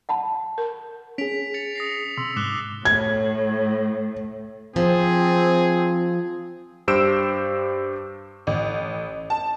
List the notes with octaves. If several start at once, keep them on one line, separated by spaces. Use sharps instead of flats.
F#5 A5 B5
A#4
C#4 G#4 B6 D7 F7
A6 C#7 F7
D#6 A#6 C7
C3 C6 E6
G#2 D6 F#6 G7
A2 G#6
F3 C4 G#4
G2 G4 C5 E6 D7 E7
A1
A5